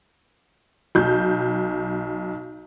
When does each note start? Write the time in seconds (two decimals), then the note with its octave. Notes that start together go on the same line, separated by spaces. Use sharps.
0.95 B1 G6